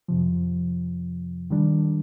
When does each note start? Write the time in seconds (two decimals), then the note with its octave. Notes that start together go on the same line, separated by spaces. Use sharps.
0.08 F2 C3 F3
1.50 D#3 G3 D4